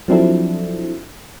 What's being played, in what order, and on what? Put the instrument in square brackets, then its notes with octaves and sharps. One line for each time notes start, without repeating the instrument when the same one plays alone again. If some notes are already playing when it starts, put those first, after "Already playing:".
[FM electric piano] F3 F#3 C4 D4 E4 A4